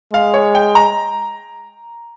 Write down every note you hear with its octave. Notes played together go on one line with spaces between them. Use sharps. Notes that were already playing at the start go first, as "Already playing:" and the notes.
G#3 F5
C#5
G5
A#5